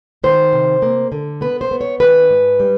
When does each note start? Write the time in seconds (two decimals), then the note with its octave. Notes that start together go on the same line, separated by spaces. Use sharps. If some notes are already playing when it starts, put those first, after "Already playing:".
0.24 D#3 C5
0.53 C3
0.82 A#3
1.12 D3
1.41 B3 B4
1.61 C5
1.71 B3
1.81 C#5
2.00 D#3 B4
2.30 G#2
2.60 G3